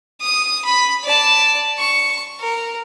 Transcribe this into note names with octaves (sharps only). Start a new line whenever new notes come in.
D#6
B5
D5 A5
C#6
A#4